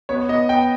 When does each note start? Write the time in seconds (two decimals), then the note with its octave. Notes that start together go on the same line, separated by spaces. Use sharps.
0.09 B3 C#5
0.29 B3 D#5
0.49 B3 G5